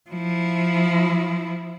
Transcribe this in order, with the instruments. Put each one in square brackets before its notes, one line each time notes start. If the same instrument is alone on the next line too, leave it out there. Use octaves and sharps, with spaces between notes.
[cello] F3 E4